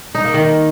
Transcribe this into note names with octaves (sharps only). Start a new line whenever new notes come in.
D#4
A#3
D#3